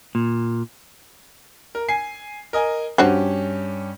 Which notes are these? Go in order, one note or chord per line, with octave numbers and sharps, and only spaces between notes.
A#2
A#4
G#5 C7
A#4 D#5 G#5
G2 C#4 D4 F#4 G4 C5